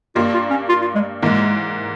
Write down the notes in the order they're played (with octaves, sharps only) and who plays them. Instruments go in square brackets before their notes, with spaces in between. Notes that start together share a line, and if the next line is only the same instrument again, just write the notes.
[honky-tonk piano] G2 G3 A#3 [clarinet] F4
[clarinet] F4
C#4
F4
F4
G#3
[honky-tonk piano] G#2 E3 A#3 [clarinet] G#3